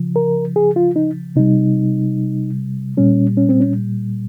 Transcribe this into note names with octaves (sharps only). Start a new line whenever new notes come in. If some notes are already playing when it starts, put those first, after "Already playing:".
Already playing: C#3 F3
A#4
G#4
F4
D#4
C3 G3 D#4
A#2 G3 C#4
C#4
C4
C#4